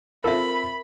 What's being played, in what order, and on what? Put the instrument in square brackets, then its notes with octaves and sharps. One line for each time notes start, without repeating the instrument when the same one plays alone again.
[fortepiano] C4 F4 A4 [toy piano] A#4 E5 [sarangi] B5